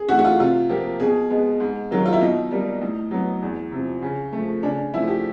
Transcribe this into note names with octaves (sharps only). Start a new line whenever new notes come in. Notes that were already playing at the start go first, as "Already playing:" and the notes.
Already playing: G#4
E3 A3 F#4
F#4
F4
C3 F4
F3 A#3 G4
B2 G#4
G#3 B3
G#2
D#3 F#3 A#3
F4
E4
B2 D#4
G3 A#3
A2
F#3 B3
E2
C3 F3
C#3
A3
F3
C#3 D4
F3 A3 E4
G4